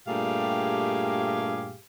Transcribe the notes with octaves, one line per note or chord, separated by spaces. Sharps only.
G2 A#2 A3 G4 G#4 F5